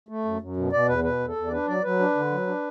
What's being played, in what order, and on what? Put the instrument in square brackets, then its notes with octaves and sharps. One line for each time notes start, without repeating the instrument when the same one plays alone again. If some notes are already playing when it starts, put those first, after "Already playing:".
[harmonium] A3
F#2
F#2
B2
B2 D5
E2 B4
B2 B4
E2
A4
E2
D5
D4 B4
F#3 D5
F#3 B4
D4
D3
F#3
D4